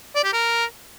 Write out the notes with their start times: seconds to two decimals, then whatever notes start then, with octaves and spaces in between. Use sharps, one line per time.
0.16 D5
0.24 G4
0.33 A#4